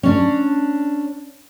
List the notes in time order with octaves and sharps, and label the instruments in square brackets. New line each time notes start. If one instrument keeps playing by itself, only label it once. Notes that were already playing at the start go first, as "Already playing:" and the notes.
[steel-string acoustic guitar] C#4 D4